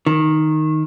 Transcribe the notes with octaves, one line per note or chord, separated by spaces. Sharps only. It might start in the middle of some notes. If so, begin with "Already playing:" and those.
D#3